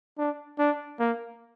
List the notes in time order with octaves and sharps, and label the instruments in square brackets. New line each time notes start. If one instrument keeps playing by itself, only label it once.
[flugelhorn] D4
D4
A#3